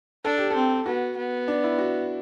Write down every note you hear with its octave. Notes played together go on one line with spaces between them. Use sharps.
D4 A4
G4
C4 A4
B3 F#4
B3
D4
E4
F#4